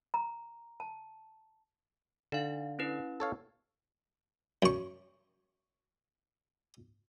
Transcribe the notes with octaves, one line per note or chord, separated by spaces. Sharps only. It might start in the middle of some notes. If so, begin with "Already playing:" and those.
A#5
A5
D3 D#4 F5
C#4 E4 B4
A4 C#5 F5
F#2 C#6